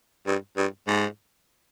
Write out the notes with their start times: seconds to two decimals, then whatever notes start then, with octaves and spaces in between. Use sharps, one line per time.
0.27 G2
0.57 G2
0.87 G#2